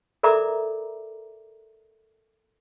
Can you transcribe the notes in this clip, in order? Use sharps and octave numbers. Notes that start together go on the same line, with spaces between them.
A4 A#4 D5 E5 A#5 D6